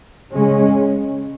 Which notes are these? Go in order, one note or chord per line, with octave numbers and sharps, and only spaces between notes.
C#3 G#3 C#4